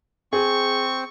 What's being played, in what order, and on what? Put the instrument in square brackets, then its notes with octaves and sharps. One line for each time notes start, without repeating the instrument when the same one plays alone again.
[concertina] C4 [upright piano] G#4 [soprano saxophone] C#6